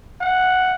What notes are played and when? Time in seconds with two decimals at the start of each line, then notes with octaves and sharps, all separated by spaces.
0.20 F#5